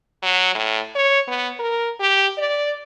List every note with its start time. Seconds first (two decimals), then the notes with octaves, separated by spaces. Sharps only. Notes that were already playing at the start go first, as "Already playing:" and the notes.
0.23 F#3
0.55 A2
0.95 C#5
1.28 B3
1.60 A#4
2.00 G4
2.38 D5